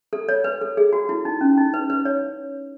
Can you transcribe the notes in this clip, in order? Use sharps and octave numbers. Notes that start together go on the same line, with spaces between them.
A4
C#5
B4
A4
G#4
F#4
E4
D#4
C#4
D#4
B4
B4
C#5